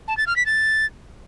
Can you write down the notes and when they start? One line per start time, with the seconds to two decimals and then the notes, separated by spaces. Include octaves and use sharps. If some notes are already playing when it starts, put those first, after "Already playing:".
0.08 A5
0.17 A6
0.27 F6
0.36 B6
0.46 A6